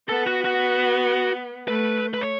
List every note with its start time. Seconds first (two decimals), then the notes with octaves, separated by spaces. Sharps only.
0.09 B3 A4
0.27 F#4
0.45 F#4
1.68 A3 B4
2.14 B4
2.21 C#5